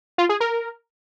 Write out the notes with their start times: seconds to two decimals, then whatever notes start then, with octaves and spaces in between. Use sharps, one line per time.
0.18 F4
0.29 G#4
0.40 A#4